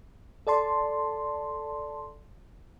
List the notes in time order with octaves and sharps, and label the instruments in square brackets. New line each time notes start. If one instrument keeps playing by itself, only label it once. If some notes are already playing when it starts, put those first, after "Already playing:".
[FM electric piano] A4 D5 A5 C6